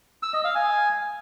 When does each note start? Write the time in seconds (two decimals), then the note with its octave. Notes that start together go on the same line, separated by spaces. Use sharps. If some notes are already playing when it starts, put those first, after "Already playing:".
0.23 E6
0.34 D#5
0.44 F5
0.55 G#5